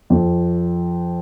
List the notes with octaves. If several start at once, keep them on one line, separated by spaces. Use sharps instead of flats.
F2